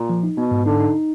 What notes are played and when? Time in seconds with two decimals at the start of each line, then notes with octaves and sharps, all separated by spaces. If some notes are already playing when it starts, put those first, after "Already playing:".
Already playing: A#2
0.09 F3
0.23 D#4
0.37 B2 B3
0.51 G#2
0.66 D3 D#4
0.80 D#4